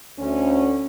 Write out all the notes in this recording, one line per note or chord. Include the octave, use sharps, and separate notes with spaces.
D2 C#4